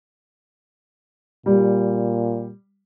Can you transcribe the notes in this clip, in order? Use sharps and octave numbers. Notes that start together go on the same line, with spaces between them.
A#2 G3